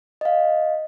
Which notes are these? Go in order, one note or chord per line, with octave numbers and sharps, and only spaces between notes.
D#5 F5